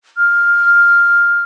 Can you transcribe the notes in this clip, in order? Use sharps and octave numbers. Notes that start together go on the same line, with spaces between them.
F6